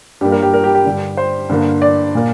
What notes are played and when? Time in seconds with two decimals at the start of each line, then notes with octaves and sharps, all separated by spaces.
0.21 G2 G3 A#3 G4
0.32 A#4
0.42 G4
0.54 A#4
0.64 G4
0.75 G4
0.85 G2 D3 G3
1.17 C5
1.49 G2 D3 A#3
1.82 D5
2.15 A#2 A#3